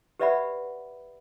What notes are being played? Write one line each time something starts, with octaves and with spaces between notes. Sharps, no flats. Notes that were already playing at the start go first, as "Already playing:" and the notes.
G4 B4 D5 E5 F#5 B5